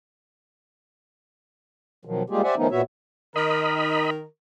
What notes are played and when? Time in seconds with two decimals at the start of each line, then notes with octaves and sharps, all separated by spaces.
2.05 B2 D#3 F3 F#3
2.30 G3 G#3 A#3 F4 G4 G#4
2.43 G4 C5 D5 E5 F#5 G#5
2.57 D#3 F3 A3 B3 C#4 D#4
2.71 A#2 B3 F#4 C#5 E5
3.36 D#3 A#4 D#5 B5